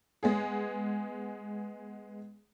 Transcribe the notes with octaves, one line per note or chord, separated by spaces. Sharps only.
G#3 B3 G#4